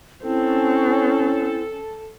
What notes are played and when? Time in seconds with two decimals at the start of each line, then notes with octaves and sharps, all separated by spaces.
0.24 C4 C#4 E4 A4